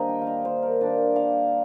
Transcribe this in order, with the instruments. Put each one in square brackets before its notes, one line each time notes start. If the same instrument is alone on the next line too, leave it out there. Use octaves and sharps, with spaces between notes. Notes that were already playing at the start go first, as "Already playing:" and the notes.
Already playing: [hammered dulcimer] D#3 G3 A#3 D4 A#4 C5 D#5
G5
F5
D#5
C5
A#4
D#3 A#3 D4 D5
F5